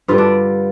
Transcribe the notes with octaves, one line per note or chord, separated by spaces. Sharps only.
G2 D3 G3 F4
D4